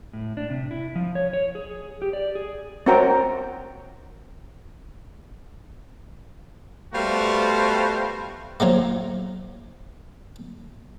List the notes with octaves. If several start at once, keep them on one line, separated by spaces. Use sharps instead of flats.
A2
D4
C3
E4
F3
C#5
C#5
G#4
G4
D5
G#4
C4 C#4 F#4 A#4 G5 A#5
G3 A3 B3 F4 F#4 C5
F3 F#3 A3 A#3